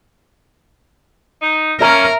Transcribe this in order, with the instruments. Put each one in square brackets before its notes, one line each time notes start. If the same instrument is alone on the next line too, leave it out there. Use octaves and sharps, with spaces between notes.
[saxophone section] D#4
[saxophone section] A#3 C#4 [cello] A#4 [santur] E5 A#5